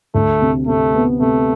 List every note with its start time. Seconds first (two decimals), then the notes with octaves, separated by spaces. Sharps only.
0.14 D2 A3
0.41 C3
0.67 C3 A3
0.94 B3
1.21 C3 A3